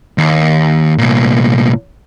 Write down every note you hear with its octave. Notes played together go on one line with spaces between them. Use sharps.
D#2
C2 A#2